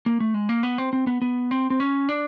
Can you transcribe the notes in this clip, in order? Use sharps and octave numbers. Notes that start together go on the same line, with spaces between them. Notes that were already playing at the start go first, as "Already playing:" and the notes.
A#3
A3
G#3
A#3
B3
C4
C4
B3
B3
C4
C4
C#4
D4